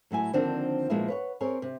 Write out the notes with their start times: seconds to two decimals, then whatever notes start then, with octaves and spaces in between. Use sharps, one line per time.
0.11 A2 F#3 E4 G#5
0.33 D3 D#3 F3 A#3 C4 D4
0.90 A#2 F3 G#3 A#3 B3 E4
1.08 B4 C#5 F#5
1.41 C4 G#4 A#4 C#5
1.62 C3